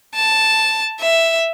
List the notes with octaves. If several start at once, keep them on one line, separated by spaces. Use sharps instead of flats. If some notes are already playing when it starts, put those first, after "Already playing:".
A5
E5